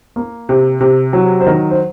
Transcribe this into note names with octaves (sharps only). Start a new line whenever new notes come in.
A#3
C3
C3
F#3
C5
D#3 A#4
C5